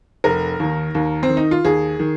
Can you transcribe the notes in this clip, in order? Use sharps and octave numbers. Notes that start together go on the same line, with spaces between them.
F1 A#4
D#2 D#3
D#2
C4
D#3
D#4
F4
D#2 G#4
D#3